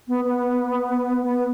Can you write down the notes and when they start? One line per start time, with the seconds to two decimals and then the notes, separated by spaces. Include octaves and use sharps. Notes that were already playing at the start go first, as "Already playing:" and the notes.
0.08 B3
0.25 B3
1.23 B3